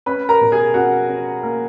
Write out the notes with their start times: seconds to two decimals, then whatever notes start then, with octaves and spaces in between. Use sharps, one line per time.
0.06 C#4 B4 B5
0.29 A#4 A#5
0.41 B2
0.52 G#4 G#5
0.74 C#4 F#4 F#5
1.09 C#4
1.43 A#3